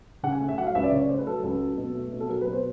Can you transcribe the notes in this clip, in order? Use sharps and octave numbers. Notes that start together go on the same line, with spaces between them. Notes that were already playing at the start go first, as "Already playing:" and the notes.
C#3 F#5
G#5
A3
E5
F#3 F#5
F5
C#2 E5
D5
C#3 C#5
D5
A3 C5
B4
F#3 A4
C#2
F#3
B2
A3
B2
A4
F#3 A#4
B4
B2
C5